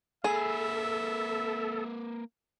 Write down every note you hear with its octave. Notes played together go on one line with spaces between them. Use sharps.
A#3 G#4 A4 B4 E5